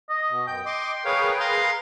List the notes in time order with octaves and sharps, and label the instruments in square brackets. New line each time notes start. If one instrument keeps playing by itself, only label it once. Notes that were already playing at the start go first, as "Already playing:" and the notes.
[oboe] D#5
[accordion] B2
[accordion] F#2 G6 [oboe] G5
[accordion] D#5 D6 [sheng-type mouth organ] C6
[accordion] G#4 A#4 B4 [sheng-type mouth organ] C#5 F5
[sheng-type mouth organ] F5 A#5 C6